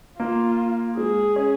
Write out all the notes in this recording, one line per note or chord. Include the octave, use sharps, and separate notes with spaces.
A#3 F4
G#3 G#4
C#4